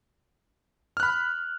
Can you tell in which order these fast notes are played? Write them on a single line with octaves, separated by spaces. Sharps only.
F6 F#6 B5